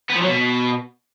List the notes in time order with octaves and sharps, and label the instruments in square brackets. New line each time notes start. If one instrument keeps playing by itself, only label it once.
[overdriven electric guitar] B3
F3
F#3
B2